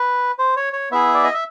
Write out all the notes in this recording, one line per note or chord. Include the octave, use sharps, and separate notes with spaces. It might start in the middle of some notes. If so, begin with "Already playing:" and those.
Already playing: B4
C5
C#5
C#5
B3 E4 G#4 E5
D5
D#5
E5